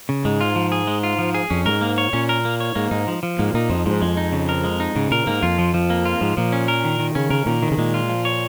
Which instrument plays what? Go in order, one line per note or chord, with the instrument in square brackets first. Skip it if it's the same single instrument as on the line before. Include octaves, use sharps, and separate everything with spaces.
[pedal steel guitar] C#3
[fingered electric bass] G#2 [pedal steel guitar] G#3
[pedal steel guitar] F4
F3
G#4
G#3
F4
F3
G#4
[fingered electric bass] F2 [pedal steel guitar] C#4
[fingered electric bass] G#2 [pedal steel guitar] A#4
[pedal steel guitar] A#3
C#5
[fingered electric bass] A#2 [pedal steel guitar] C#4
[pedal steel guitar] A#4
A#3
C#5
[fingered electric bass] G#2 [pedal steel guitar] A#3
[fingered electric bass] G#2 [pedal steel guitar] D#4
[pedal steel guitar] F3
F3
[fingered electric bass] G#2 [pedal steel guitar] A#3
[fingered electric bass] A#2 [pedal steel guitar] D#4
[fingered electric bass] F2 [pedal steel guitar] F3
[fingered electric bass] G#2 [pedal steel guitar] F3
[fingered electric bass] F2 [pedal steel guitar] G#3
[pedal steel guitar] D#4
C#3
A#4
G#3
D#4
[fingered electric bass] G#2 [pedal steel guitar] C#3
[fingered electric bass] A#2 [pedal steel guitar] A#4
[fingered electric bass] G#2 [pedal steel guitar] A#3
[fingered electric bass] F2 [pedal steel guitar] F4
[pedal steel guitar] F3
F3
A#3
F4
[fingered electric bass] G#2 [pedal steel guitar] F3
[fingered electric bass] A#2 [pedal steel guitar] F3
[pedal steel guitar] C#4
A#4
D#3
D#3
[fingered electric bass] C#3 [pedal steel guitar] C#4
[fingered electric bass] C#3 [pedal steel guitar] A#4
[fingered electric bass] A#2 [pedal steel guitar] D#3
[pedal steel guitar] D#3
[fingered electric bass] C#3
[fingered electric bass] A#2 [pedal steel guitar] G#3
[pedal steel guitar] F4
F3
C#5